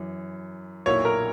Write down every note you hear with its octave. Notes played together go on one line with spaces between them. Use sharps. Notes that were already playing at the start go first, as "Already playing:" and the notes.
Already playing: F#2 E3
B1 A#2 A#3 E4 C#5
A#4